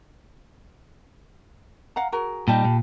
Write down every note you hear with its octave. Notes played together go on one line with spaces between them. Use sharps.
F5 F#5 A#5
F#4 G#4 A#4
A#2 G3 D#4 G4 A5 B5
A#2